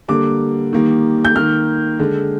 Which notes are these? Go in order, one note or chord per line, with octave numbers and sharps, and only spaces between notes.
D3 G3 A#3 D6
D#3 G3 A#3
G6
D#3 A#3 F6
D3 G#3